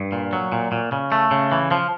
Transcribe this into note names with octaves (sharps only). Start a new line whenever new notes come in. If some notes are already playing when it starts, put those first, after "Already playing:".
Already playing: G2
A#2
F#3
A#2
A#2
C#3
A3
C#3
E3
F3